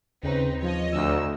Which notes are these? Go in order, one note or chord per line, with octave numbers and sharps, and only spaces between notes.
D#2 C#3 C4 D#4 B4
F3 C#5 D#5
D2 E6